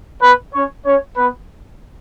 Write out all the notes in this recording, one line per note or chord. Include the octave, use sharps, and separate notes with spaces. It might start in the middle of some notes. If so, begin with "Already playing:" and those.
B3 B4
C#4 C#5
C#4 C#5
B3 B4